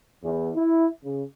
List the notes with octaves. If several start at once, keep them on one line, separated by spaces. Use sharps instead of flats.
E2
E4
C#3